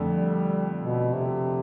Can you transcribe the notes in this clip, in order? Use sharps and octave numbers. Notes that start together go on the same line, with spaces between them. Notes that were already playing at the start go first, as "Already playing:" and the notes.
Already playing: F2 D3 A3 D4 A4
G3
B2
C3